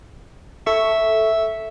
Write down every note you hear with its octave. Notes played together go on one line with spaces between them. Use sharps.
A4 E5 C#6